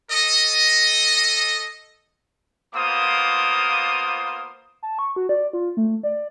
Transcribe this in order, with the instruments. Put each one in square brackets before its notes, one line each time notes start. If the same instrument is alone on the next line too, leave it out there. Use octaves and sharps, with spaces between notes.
[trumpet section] A4 D#5
A#3 B3 F4 C5 D6 D#6
[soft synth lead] A5
C#6
F#4
D5
F4
A3
D5